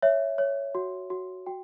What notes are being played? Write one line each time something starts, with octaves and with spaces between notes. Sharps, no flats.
C#5 E5
C#5
F#4
F#4
F#4 G5